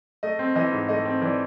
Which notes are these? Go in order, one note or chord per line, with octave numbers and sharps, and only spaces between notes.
A3 D#5
C4
E3 D#5
G#2
A3 D#5
C4
E3 D5